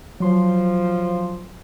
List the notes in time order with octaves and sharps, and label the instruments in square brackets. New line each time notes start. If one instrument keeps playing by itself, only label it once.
[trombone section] F3 [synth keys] F#3 C6